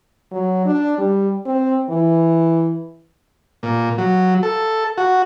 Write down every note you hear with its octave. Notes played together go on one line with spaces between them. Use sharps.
F#3
D4
G3
C4
E3
A#2
F#3
A4
F#4